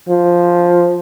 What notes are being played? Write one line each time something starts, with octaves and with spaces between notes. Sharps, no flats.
F3